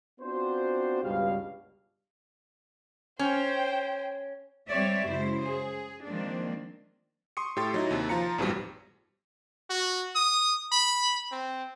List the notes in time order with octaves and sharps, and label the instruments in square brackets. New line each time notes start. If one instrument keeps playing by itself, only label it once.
[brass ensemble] B3 C4 D4 F4 F#4 C5
C#2 G2 B2 G3 G4 F5
[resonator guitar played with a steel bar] C#4 [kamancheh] C5 G5
[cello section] G3 C4 G4 C#5 D5 E5
F#2 C#3 G#3 E4 C5
G#4
D#3 F3 G#3 A#3 C4 D4
[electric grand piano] C6 C#6 D#6 C#7
A2 G4 A4 C6 A6
F#3 D#4 E4
D#2 C3
F3 F4 A#5 C#7
A1 F2 G#2 B2 F3 G3
[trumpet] F#4
D#6
B5
C4